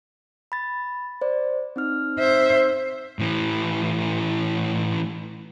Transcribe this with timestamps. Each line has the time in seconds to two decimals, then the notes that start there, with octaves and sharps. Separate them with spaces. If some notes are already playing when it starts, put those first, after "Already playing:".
0.52 B5 A6
1.21 C5 D5
1.76 C4 D#4 F6
2.19 C5 E5
3.19 A2 E3